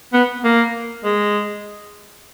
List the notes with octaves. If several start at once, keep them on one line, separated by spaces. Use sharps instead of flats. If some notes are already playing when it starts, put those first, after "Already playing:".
B3
A#3
G#3